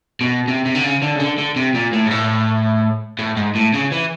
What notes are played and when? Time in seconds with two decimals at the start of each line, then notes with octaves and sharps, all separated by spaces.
0.21 B2
0.48 C3
0.66 C3
0.75 D3
0.84 C#3
1.02 D3
1.16 C#3
1.20 D3
1.38 D3
1.56 C3
1.74 A#2
1.93 A2
2.06 G#2
2.11 A2
3.19 A2
3.37 G#2
3.55 A2
3.73 C#3
3.91 E3